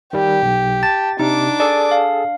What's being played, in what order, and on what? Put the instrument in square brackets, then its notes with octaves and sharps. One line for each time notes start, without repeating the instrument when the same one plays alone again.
[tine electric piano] D#3 G3 [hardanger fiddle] G4
[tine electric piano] B1
[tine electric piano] A5 [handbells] A6
[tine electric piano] C3 [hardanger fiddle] D4 D6 [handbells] D#4
[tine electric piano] G#4 A4 A5 [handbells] D5
[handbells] F5